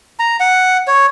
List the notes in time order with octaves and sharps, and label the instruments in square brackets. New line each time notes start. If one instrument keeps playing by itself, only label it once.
[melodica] A#5
F#5
C#5